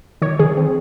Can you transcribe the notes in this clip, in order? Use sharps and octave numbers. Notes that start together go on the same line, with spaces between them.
D#3 C#5
D#3 G#4
C4